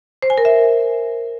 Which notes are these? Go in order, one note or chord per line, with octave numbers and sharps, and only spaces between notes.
C5
G#5
A#4
E5